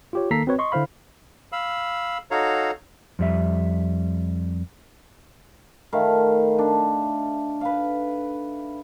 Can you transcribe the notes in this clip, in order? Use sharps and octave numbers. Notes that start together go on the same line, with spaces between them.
F4 G4 C#5
D#3 A#3 A4 A#5 B6 C7
C4 F#4 B4 C#5
D#5 C6 C#6
D3 E4 C5 F5 B5
F5 B5 E6
D#4 F#4 A4 C#5 F5 A#5
F2 G3 E5
D#3 A3 F5 B5
D4
B4 F5